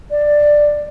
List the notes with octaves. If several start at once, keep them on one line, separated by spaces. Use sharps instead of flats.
D5